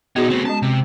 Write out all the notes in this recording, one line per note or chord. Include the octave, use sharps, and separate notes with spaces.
A#2 B3 D#4 F#4 G#4
A3 C4
G#3 C#4 A5
C3